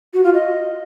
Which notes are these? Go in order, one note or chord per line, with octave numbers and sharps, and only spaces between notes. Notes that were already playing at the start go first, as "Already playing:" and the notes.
F#4
F4
D#5